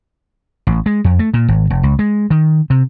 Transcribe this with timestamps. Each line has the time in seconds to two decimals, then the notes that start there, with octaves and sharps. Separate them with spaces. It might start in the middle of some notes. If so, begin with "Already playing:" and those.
0.67 A1
0.86 G#3
1.04 F2
1.19 A3
1.34 A#2
1.48 G#1
1.70 F1
1.83 C#2
1.99 G#3
2.30 D#3
2.70 C3